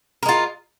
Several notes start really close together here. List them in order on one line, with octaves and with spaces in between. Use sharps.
A#4 G#3 F4